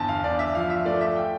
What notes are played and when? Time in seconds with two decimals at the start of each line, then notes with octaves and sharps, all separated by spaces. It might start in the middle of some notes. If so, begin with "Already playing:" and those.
Already playing: G1 E2 A5
0.08 F5
0.23 G1 D5
0.39 E5
0.55 F3 F5
0.70 E5
0.85 A3 D5
1.01 E5
1.16 G5